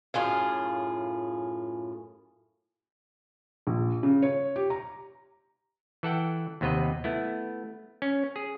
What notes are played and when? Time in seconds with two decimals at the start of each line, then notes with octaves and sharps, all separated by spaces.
0.14 F#2 A2 F4 G#4 F5
3.67 A#1
4.03 C#3
4.22 C#5
4.56 G4
4.70 A#5
6.03 E3 A4 F#5 G5
6.61 D#2 C3 B3 B4 D#5
7.04 A3 B3 E4
8.02 C#4
8.36 G#4